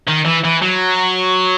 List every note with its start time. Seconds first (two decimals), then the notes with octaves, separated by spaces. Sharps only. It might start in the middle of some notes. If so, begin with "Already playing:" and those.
0.08 D#3
0.26 E3
0.45 E3
0.62 F#3